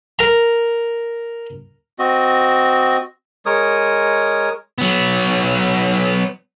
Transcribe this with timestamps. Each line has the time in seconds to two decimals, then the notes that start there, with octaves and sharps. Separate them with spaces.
0.19 A#4 A#5
1.99 C4 F#4 D#5
3.46 G#3 A#4 C#5 D#6
4.78 F#3 B3